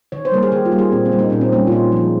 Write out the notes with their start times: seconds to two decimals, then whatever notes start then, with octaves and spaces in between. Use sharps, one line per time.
0.12 D#3 C#5
0.25 C5
0.32 G3 A#3 A#4
0.43 G#4
0.52 D#3 G4
0.65 F4
0.72 G3 A#3
0.78 G#4
0.92 A#2 C4
1.05 C4
1.12 G3 A#3
1.19 D#4
1.30 A#2 C#4
1.41 C4
1.52 G3 A#3 C#4
1.67 F4
1.72 A#2 D#4
1.92 F3 G#3